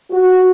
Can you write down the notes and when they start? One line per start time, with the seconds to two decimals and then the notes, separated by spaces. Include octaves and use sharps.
0.12 F#4